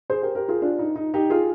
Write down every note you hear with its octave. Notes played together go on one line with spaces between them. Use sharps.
G#4 C5
G4 A#4
G4 A#4
F4 G#4
D4 F4
D#4
D#4
D#4 G4
F4 G#4